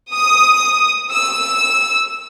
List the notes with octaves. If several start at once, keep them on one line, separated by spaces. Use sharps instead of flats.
D#6
E6